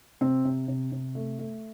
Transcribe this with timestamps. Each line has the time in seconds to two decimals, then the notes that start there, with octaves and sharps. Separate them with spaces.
0.21 C3 C4
0.45 C3
0.68 C3
0.92 C3
1.15 A3
1.39 A3